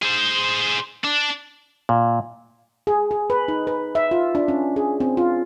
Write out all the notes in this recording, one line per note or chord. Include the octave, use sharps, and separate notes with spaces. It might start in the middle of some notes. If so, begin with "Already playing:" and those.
G#4 C5
D4
A#2
G#4
G#4
B4
D#4
B4
E5
F4
D4
C#4
G#4
C4
F4